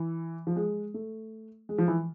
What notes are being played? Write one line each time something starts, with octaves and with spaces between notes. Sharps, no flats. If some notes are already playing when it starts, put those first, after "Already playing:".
Already playing: E3
F3
G#3
A3
G#3
F3
E3